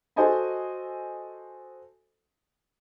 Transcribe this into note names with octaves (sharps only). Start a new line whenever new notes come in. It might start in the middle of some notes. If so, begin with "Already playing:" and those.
F#4 A4 C5 D#5 G#5 A5